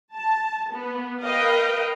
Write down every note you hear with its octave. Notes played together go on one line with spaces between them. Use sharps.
A5
B3
A#4 B4 D#5 F5 G5